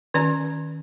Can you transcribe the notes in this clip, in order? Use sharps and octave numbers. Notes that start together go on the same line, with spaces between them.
D#3 C#4 D5 A#5